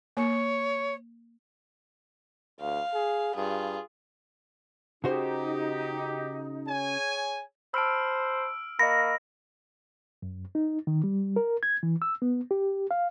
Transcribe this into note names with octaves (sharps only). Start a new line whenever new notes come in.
A#3 C#5
D2 F5
G#4
G2 F4 G#4
C#3 D#4 F#4 G4 C5
G#4 C#5 G#5
C5 A5 B5 E6 F6 D7
A#3 D#5 B5 A#6
F#2
D#4
D#3
G3
A#4
G#6
E3
E6
B3
G4
F5